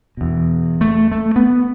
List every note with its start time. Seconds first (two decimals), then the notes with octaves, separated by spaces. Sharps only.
0.17 E2 B2
0.81 A3
1.12 A3
1.36 B3